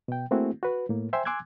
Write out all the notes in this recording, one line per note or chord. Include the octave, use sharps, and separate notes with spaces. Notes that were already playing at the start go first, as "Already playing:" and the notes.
B2 G5
A3 A#3 C4 E4 F#4 G#4
F#4 B4
A2 A#3
C5 E5 G5 G#5 C6
G#5 C6 D6 E6 F#6 G#6